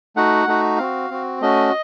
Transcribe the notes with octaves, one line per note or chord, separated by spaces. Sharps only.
A3 D#4 F#4 F#5
A3 D#4 F#4
C4 F#4 F5
C4 F#4
A3 C#4 F#4 D#5